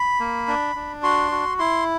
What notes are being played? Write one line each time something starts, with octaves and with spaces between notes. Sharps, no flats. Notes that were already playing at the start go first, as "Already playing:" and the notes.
Already playing: B5
A#3
D4
D4
F#4 C6
F#4
E4 C6